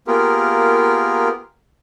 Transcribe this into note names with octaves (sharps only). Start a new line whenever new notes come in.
A#3 B3 F4 G4 G#4 A#4